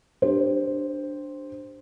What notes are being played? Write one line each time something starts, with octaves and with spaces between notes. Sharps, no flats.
D4 G4 C5